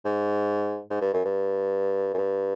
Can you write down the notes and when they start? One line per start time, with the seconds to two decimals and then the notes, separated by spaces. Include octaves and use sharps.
0.05 G#2
0.91 G#2
1.02 G2
1.14 F#2
1.25 G2
2.14 F#2
2.18 G2